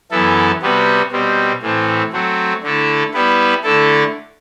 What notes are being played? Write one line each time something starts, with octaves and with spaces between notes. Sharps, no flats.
F#2 E3 B3 E4 A4
C3 G3 B3 F#4 B4
B2 G3 C4
A2 E3 A3 C4
F#3 A3 C4 F#4
D3 A3 E4 A4
G3 B3 E4 B4
D3 A3 E4 A4